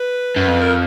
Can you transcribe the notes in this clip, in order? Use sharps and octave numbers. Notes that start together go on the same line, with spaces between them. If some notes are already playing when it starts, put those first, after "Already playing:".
Already playing: B4
F#2
F2
A#4